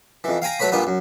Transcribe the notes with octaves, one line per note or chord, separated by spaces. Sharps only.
F2 E3
F5 G5 G#5 A#5
F#3 A3 B4 C#5 B5
G2 A#2 B3 B4
F#2